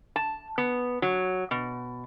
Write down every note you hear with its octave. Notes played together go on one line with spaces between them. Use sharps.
A5
B3
F#3
B2